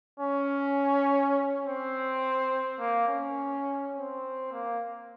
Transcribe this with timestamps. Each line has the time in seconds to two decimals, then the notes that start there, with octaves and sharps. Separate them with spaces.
0.20 C#4
1.65 C4
2.79 A#3
3.08 C#4
3.95 C4
4.52 A#3